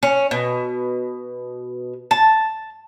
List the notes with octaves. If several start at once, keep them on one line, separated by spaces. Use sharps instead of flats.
C#4
B2
A5